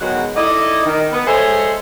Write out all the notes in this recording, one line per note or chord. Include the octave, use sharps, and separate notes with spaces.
B2 D#3 F#3 G#3 F#4 F#5
D#4 E4 A4 D5 D#5
D#3
B3
G#3 G#4 A4 C5 C#5 E5